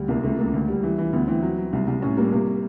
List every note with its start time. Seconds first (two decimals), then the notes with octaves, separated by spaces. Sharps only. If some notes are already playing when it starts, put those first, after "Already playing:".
Already playing: D2 G3
0.08 C2 A#3
0.23 C#2 A3
0.38 C#2 A#3
0.53 D2
0.68 G3
0.83 E3
0.98 E3
1.13 D2 B3
1.27 E3 C4
1.42 F#3
1.58 F#3
1.73 C2
1.87 C2
2.02 A2 C#4
2.17 G3 A#3
2.32 C3 A#3